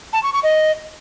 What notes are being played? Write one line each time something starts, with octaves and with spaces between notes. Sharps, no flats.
A5
C#6
C#6
D#5